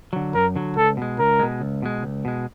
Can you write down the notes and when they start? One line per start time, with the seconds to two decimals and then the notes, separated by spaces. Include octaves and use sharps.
0.13 D3 F#3
0.34 F#2 A#4
0.56 D3 F#3
0.76 C#2 A4
0.97 B2 G#3
1.18 C#2 A#4
1.40 B2 G#3
1.61 C#2
1.82 B2 G#3
2.03 C#2
2.25 B2 G#3